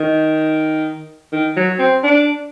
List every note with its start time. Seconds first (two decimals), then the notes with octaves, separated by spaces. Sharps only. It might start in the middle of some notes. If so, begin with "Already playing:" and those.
Already playing: D#3
1.33 D#3
1.57 F#3
1.79 C4
2.03 D4